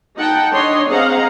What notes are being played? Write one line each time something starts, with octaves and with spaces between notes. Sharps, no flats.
D#4 F#5 G5 A5
D4 C#5 D#5 C6
C4 G#4 D#5 F5 F#5 A#5